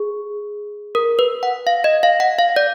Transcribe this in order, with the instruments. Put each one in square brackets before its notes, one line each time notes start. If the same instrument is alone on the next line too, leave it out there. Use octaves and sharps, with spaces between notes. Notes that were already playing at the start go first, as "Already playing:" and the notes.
Already playing: [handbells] G#4
A#4
B4
F#5
F5
D#5
F5
F#5
F5
D5